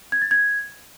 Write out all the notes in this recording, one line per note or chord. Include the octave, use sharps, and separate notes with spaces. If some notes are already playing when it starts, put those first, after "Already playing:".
G#6
A6
G#6